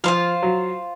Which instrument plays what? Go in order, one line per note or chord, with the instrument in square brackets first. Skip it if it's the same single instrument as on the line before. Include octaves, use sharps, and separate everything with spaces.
[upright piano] F3 [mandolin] F4 C5 F5
[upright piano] F#3